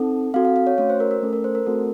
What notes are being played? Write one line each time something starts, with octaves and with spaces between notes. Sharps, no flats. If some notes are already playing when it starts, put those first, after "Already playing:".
Already playing: C4 D#4 A4
C4 F#4 A4 F5
F5
F5
C#5
A3 C#4 F#4 C#5
C5
A#4
A#4
A3 C#4 A4
A#4
C5
A#4
A3 C4 F#4 A4